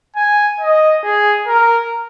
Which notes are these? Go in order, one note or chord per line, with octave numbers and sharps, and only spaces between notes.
G#5
D#5
G#4
A#4